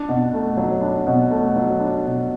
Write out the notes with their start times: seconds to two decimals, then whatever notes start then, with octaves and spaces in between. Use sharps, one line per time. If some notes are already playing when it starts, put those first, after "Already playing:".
Already playing: D4
0.09 B2
0.34 A3
0.57 F#3
0.82 D4
1.07 B2
1.31 A3
1.56 F#3
1.80 D4
2.05 B2